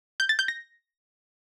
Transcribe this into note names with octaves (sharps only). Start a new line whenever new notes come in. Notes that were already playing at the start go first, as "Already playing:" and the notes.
G6
A6
G6
A#6